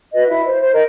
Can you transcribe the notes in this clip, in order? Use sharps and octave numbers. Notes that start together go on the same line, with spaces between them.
F#4 B4 D#5
E4 E5
C5
C5
A#4 D#5